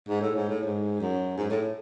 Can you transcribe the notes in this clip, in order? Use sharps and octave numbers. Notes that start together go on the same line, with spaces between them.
G#2
A2
G#2
A2
G#2
F#2
G#2
A2